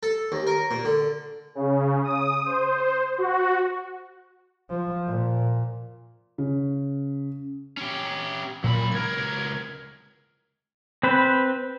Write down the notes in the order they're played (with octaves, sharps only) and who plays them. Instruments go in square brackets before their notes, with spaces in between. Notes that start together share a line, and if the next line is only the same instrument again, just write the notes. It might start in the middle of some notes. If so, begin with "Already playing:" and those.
[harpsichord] A4
D#2
A#4
A#2
D3
[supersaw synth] C#3
D#6
C5
F#4
[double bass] F3
A#2
[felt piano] C#3
[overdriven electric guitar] C#4 G4
[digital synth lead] A#2 [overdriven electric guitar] F#3 B5
[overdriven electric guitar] C#2 A#4 [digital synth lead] G#6
[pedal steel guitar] C4 B4 C5